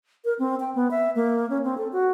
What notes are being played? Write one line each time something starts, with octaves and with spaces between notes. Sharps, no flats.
A#4
C4
G5
B3
E5
A#3
C#4
C4
A4
F#4